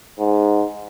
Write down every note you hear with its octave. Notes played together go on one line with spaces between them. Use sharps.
G#2